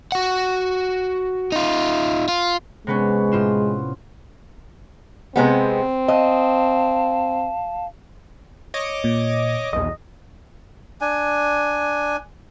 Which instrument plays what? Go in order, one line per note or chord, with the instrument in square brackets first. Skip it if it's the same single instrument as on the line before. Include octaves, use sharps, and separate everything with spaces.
[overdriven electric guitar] F#4 F#5
D#4 F4
F4
[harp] C3 B3 C#4 [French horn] G#3
[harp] A2 F4 E7
[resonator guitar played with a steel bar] C3 G#3 B3 [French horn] C4
[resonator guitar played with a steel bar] D#5 [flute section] F5 A5
[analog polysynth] C#5 D#5 D6
[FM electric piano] A#2
[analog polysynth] B1 E2 [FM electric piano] D#5
[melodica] D4 G#5